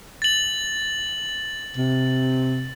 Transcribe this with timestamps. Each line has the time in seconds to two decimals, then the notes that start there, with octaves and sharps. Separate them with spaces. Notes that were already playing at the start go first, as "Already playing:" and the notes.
0.22 A6 F#7
1.77 C3